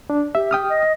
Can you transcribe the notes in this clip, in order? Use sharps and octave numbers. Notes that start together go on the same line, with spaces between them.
D4
G4 E5
G5 D#6 F6
D#5